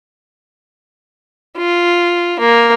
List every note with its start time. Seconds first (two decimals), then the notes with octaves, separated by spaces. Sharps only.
1.57 F4
2.40 A#3